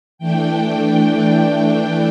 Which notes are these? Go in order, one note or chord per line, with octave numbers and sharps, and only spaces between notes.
E3 A3 D4 G5